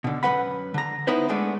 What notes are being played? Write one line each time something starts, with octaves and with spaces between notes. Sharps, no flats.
B2 D3
F#2 A3 B4 F#5 B5
D3 A#5
B3 D#4 E4 B4 C5
G#3 A3 B3 D4 D5